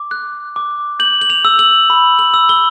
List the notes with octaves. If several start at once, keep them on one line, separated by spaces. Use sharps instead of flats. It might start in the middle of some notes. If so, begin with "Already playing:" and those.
Already playing: D6
F#6
D6
G6 F#7
F#7
F7
E6
F#7
B5
F#7
E6
G7